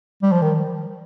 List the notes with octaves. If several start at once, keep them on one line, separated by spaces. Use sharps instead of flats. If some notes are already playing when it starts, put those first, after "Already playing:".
G3
F3
D#3